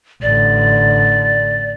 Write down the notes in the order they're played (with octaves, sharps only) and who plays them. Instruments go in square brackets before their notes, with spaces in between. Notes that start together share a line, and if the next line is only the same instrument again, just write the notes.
[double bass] A1 D3 [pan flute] D5